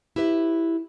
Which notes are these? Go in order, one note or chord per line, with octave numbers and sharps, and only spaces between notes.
E4 G4 B4 E5